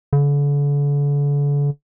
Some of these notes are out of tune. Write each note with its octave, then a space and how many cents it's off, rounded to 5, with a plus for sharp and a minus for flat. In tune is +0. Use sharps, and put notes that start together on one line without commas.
D3 -40